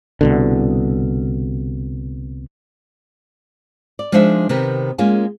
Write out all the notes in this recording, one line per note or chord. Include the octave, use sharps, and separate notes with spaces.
C2 B2 D3
D5
F3 G#3 D4 D#4 C5 E5
C3 D#3 B3 G4 A#4
G#3 A#3 C#4 F4 G#4